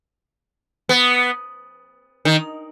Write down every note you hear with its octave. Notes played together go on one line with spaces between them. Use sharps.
B3
D#3